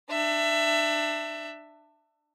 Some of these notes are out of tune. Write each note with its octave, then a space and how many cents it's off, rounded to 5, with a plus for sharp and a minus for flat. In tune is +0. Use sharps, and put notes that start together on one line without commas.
D4 +25 E5 +15